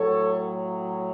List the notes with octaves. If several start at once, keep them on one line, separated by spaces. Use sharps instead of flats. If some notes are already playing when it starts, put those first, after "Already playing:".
Already playing: A2 F#3 A4 C#5